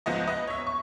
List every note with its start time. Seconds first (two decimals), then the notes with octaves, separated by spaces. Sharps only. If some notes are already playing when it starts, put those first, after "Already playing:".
0.06 C#2 G#2 F3 B3 D#5
0.27 B4 D#5
0.47 C#5 E5
0.67 C#6